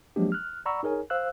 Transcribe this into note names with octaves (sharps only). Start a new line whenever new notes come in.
F3 F#3 G#3 A#3 D4 G4
F6 F#6
D5 F#5 A#5 B5 C#6 E6
D#4 G#4 A#4 C#5 G#5
C5 F5 E6 F#6